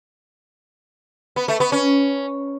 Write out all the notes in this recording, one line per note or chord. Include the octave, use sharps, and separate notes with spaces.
B3
A3
B3
C#4